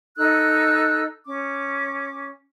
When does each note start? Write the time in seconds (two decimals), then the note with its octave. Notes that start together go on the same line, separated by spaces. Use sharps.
0.18 D#4 A4 E6 F#6
1.25 C#4 D6